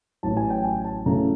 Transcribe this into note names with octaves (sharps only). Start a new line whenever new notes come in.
A1 A2 F#3 A5
G#5
G5
G#5
A5
F#2 C#3 E3 A3 C#4 A#5